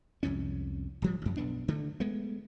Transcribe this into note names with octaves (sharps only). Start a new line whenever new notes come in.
C2 F2 G#2 C#4
D1 F3 G3
A1 F#2
B1 B3 D4
D2 D3 A3
G#3 A3 B3